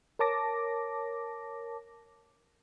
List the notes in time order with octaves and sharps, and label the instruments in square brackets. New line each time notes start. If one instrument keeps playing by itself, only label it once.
[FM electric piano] A#4 C#5 A5 D6 A#6